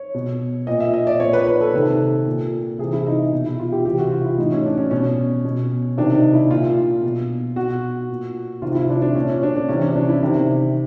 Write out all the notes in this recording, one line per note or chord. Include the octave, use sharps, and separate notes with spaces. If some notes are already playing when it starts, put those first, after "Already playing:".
Already playing: C#5
B2
A#2 D#5
E5
D#5
D5
A#2 C#5
B4
B4
A4
C3 D#3
A#2
C3 E3 G#4
E4
D#4
B2
E4
F4
G4
C3 E3 G4
F#4
F4
E4
A2 E3 D#4
C#4
D4
C#4
B2 C#4
B2
C3 D#3 D4
D#4
E4
A#2 F4
B2
B2 F#4
A#2
C3 D#3 F4
F4
E4
D4
D4
A#2 C#4
C#4
D4
D4
C3 E3 C#4
C#4
D4
E4
C3 D#3